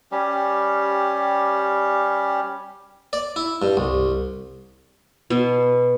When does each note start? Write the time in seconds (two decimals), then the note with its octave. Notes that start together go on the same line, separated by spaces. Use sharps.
0.12 G3 C#4 G4
3.13 D5
3.36 E4
3.62 G2
3.77 C2
5.30 B2